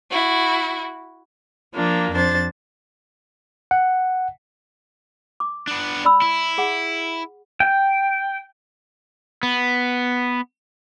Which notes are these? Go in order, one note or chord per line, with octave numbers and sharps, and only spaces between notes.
E4 F#4
F3 A#3 D4 F4
F2 D4 C5 A6
F#5
D6
B3 D4
D5 B5 E6
E4
G#4 F#5 G#5
G5
B3